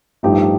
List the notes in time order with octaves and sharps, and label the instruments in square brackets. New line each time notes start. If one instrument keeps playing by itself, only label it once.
[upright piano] A1 G2 F3 D#4 G4